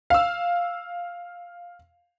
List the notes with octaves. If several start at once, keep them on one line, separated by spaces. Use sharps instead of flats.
F5 E6